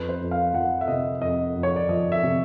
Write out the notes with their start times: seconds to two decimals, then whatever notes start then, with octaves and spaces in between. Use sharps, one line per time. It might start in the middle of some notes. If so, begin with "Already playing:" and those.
Already playing: F2 B4
0.09 C5
0.21 F2
0.31 F5
0.54 F3 F#5
0.81 E5
0.88 C3 D#5
1.21 F2 D#5
1.56 F2
1.63 C#5
1.76 D5
1.89 F3 D#5
2.12 E5
2.23 C3